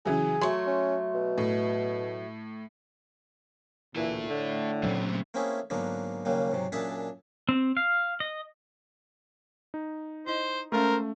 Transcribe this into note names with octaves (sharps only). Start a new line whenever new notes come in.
C#3 E3 F#3 G#4
F#3 A3 C6
C#4
B2
A2
D2 A#2 E3 E4 A4
A2 D3
A#2 C#3 F#3 A3 C4
A3 A#3 C4 C#4 E4 G#4
G#2 D3 F#3 A#3 B3
D#2 C#3 F#3 G3 A#3
G#2 C3 F#3
F#2 A#2 D4 G#4 E5 A5
C4
F5
D#5
D#4
E4 C5 D#5
G#3 A3 C#4 A#4 C5 F5